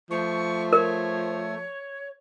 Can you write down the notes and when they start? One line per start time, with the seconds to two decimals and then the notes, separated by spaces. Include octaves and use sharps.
0.11 F3 A3 C#6
0.73 A#4 C#5